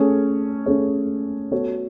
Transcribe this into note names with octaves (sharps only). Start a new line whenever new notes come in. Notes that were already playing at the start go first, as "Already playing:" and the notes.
Already playing: A3 C#4 G#4 C#5
A3 C#4 G#4 C#5
B3 F#4 A4 C#5